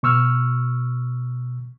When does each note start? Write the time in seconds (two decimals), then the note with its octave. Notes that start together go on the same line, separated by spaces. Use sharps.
0.03 B2 C#6 E6 F6